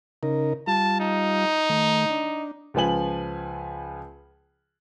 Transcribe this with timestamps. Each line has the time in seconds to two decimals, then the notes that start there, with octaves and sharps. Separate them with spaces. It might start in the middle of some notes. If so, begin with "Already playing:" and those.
0.23 C#3 D#4 A#4
0.67 G3 F4 A5
1.00 D#4
1.70 D#3 A3
2.10 D4
2.74 C#2 F3 F4 B4 G#5 F#7